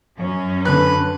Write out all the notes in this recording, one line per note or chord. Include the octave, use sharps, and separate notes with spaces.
F#2 C#4
D3 B4 F#6